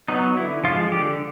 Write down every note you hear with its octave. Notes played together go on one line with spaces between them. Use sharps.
F#3 B3 D#4
D3 E4
F3 G#3 F4
D3 G4